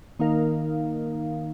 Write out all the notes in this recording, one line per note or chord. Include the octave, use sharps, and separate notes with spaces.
D#3 A#3 D#4 A#4 F5